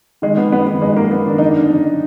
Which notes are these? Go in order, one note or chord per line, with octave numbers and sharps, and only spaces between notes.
D#3 G#3
D#3 B3
F#2 B3
D#3 B3
F#2 G#3
F#2 A#3
F#2 B3
D#3 D4
F#2 D#4
D4
D3
F#2
D3